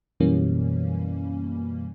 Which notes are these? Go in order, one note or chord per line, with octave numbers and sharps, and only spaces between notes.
F#2 B2 E3 G3 A#3 C#4